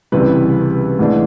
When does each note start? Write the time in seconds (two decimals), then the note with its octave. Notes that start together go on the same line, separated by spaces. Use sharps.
0.12 C#2 C3 E3 G3 B4
0.99 G#2 E3 A3 D4